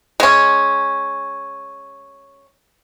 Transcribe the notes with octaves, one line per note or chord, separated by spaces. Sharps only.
G#3 C#4